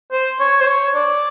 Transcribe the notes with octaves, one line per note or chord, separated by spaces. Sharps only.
C5
C#5
C5
C#5
D5